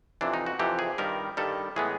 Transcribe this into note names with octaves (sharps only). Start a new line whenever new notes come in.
F2 C3 E3 D4
D#4
F#4
F2 C3 E3 G4
G#4
G2 D#3 G3 A#4
G2 D#3 G3 A4
A2 E3 G#3 B3 G#4